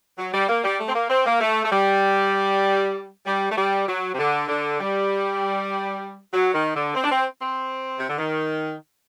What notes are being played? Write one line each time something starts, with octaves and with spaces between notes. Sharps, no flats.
F#3
G3
A#3
G3
A3
C4
A#3
C4
A#3
A3
A3
G3
G3
A3
G3
F#3
C3
D3
D3
G3
F#3
D#3
D3
C4
D4
C4
C4
C3
D3
D#3